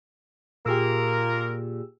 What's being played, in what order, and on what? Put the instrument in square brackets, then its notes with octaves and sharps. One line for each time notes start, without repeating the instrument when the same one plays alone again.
[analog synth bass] A#2 [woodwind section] A#3 F4 A#4 [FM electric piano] G4 G#4 E6